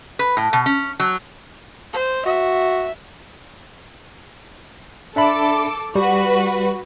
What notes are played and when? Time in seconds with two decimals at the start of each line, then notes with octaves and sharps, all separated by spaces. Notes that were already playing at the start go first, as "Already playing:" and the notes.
0.19 B4
0.37 A2
0.53 B2
0.66 C#4
1.00 F#3
1.93 C5
2.26 F#4 E5
5.16 D4 A4 E5 B5 D6
5.95 G3 F#4 B4